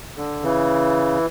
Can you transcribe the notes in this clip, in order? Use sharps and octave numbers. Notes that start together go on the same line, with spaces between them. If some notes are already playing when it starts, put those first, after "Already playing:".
D3
C#3 E3